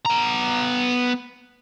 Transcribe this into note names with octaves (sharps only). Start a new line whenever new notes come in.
B3 A#5